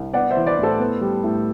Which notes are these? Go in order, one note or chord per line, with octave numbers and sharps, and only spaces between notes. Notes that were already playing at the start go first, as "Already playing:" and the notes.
Already playing: C2
B3 D5 F#5
C5 E5
E3
B4 D5
A2 A4 C5
B3
G3
A2